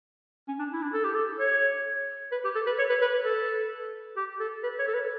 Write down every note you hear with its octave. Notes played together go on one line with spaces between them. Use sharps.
C#4
D4
E4
D4
A4
G4
A4
C#5
B4
G4
A4
B4
C#5
B4
B4
B4
A4
G4
A4
B4
C#5
A4
B4